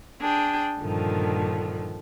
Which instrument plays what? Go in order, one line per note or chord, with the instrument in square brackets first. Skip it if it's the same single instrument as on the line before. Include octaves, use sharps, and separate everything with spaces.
[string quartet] D4 G#4 G5
G2 A#2 D3 D#3 F3